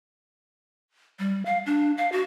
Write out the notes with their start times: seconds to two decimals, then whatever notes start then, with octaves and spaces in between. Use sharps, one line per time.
1.19 G3
1.45 F5
1.66 D4
1.97 F5
2.12 F#4